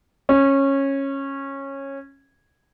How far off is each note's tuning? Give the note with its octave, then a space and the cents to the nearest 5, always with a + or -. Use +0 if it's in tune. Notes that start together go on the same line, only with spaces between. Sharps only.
C#4 -15